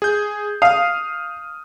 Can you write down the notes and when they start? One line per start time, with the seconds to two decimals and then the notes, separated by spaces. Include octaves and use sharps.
0.02 G#4 G6
0.62 F5 D#6 F6